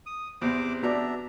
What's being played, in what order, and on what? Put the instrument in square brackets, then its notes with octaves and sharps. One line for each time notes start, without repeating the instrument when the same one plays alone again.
[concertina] D#6
[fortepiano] E2 C3 [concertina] C5 D6
[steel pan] B3 F#4 D5 [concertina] D4 E5 A#5